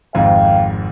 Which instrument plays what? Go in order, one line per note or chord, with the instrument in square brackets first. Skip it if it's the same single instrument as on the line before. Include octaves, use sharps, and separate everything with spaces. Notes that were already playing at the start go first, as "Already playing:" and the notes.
[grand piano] G#1 F2 G#2 [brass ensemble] F5 G5